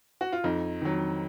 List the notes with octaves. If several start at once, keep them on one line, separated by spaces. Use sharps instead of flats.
F#4
F4
F2 D#4
D#3 F#3